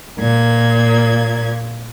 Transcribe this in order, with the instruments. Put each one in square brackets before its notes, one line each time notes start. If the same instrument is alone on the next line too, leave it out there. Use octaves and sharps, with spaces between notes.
[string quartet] A#2 A#3 G#6